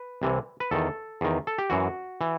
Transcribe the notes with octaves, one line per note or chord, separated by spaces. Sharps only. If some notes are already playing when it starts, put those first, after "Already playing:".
Already playing: B4
C2 C3 E3
B4
E2 D#3 A4
E2 D#3
A4
G4
F#2 E3 F#4
E3